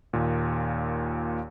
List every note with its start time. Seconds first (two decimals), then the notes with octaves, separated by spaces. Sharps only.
0.13 D#2 A#2